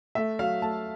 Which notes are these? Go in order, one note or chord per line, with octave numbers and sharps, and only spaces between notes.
A3 E5
F#3 F5
A3 A5